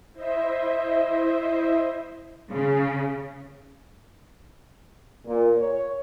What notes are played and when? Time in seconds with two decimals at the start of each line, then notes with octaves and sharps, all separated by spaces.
0.13 E4 C5 D#5 E5
2.51 C#3
5.26 A#2
5.58 C#5